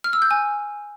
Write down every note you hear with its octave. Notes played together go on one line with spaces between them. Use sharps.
F6
E6
G6
G#5